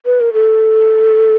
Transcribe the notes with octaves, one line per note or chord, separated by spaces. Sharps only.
B4
A#4
A4